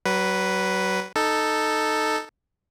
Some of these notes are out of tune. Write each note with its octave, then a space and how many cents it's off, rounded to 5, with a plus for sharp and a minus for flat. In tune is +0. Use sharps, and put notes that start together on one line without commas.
F#3 +35 B4 +0
D#4 -10 A4 +0